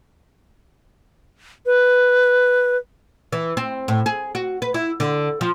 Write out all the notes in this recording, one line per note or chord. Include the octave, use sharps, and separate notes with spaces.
B4
E3
C4
A2
G#4
F#4
B4
E4
D3
F3